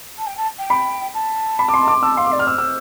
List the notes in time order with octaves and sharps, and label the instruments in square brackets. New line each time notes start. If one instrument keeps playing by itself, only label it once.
[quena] A5
G5
A5
G5
[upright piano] B5
[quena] A5
[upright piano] B5
D6
C6
D6
[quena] A5 [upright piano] E6
[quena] F5 [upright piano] C6
[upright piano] D6
[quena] D5
[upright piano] F6
[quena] C5 [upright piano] E6
[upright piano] E6